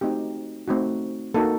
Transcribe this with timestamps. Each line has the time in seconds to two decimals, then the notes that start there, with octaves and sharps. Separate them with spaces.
0.01 A3 C4 D#4 F#4 G4
0.68 A3 C4 D#4 F#4
1.34 A#3 D#4 F#4 A4